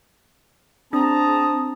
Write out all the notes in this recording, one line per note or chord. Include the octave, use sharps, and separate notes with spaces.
C4 D4 G#4 A5 A#5 D#6